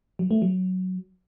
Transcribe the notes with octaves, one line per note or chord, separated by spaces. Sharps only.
F#3
A3
F#3